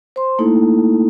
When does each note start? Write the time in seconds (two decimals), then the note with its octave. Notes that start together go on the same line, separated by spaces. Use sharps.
0.16 C5 C6
0.38 A3 A#3 D#4 E4 A4